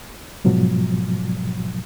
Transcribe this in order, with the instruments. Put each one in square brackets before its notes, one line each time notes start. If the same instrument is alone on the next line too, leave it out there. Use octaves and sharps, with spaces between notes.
[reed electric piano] G#2 B2 F3 F#3